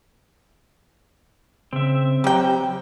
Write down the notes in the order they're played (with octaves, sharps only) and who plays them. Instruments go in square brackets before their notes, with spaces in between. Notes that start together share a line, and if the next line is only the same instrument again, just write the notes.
[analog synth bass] C#3 [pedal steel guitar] C4 E5
[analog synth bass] F#3 [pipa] G3 G5 [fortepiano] G4 A#5